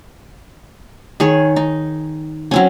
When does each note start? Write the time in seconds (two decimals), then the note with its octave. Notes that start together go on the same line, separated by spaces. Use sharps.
1.20 D#3 G#4 C#5
1.56 D#4
2.51 F#3 C4 C#4